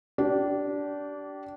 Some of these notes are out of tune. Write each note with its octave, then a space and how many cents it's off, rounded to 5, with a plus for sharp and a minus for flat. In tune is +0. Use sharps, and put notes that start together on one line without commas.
D4 -15 G4 -30